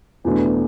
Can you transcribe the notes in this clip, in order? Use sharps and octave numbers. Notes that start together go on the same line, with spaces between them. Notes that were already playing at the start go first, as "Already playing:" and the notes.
E2 B2 A3 D4